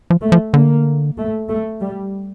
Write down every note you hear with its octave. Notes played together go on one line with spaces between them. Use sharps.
F3
A3
F3
D3 A#3
A3
A3
G3